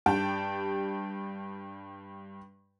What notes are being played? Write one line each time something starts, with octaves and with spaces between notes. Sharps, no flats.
G2 G4 G5 A5